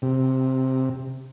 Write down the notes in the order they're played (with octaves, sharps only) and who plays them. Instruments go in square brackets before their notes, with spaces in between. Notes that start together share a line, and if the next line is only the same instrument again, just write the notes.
[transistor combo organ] C3